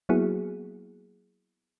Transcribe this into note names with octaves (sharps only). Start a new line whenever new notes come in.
F#3 A#3 B3 E4 F#4 G#4